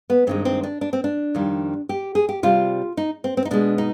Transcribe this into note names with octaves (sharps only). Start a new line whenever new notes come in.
B3
G2 D#3 G#3 C4
C4
D4
D4
C4
D4
F2 D#3 G3
G4
G#4
G4
C3 G3 F4
D#4
C4
C4
D#4
B2 G#3 D4
D#4